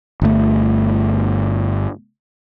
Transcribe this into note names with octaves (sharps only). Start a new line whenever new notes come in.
G1 A3